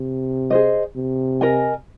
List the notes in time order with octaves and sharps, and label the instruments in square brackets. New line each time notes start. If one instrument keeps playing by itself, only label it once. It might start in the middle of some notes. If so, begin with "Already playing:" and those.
Already playing: [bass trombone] C3
[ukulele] G#4 C5 D#5
[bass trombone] C3
[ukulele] A#4 D#5 G#5